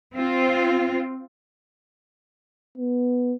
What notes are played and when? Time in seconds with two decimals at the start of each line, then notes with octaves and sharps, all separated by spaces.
0.16 C4 F4
2.78 B3